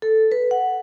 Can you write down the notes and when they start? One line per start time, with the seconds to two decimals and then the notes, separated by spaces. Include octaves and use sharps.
0.02 A4
0.32 B4
0.51 F#5